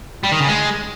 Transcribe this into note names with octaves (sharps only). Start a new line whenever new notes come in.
G3
D#3
C#3
G#3